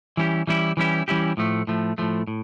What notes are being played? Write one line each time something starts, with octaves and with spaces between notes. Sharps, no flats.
E3 G3 C#4 E4 G4
E3 G3 C#4 E4 G4
E3 G3 C#4 E4 G4
E3 G3 C#4 E4 G4
A2 F3 A3
A2 F3 A3
A2 F3 A3
A2